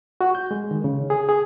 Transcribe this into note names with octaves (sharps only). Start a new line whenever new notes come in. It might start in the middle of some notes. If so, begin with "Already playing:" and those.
F#4
G6
G#3
D#3
C#3
G#4
G#4